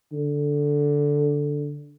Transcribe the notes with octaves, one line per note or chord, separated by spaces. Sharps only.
D3